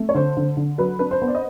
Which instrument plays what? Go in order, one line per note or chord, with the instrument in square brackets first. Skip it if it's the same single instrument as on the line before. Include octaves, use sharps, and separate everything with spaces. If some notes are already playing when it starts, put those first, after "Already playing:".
Already playing: [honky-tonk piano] A3
C#5
D3 C5
D3
D3
F#3 B4
D4 B4
C5
B3
D5
D#5